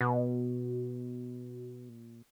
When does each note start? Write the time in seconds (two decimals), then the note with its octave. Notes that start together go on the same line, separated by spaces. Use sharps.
0.01 B2
1.89 A#2